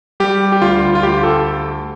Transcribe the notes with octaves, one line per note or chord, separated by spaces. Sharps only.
G3 G4
G4
D2 F4
F4
D2 G4
A4